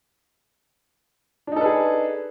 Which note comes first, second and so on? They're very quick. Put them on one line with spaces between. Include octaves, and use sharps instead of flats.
D4 D#4 A4 B4 G#4